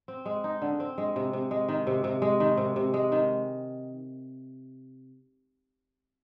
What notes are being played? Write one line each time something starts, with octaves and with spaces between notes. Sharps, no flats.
C4
G#3
D#4
D3
C4
G#3
C3
C3
G#3
D#3
C3
C3
G#3
D#3
C3
C3
G#3
D#3